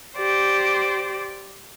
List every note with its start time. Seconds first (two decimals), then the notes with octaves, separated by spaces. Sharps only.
0.16 G4 C5 D5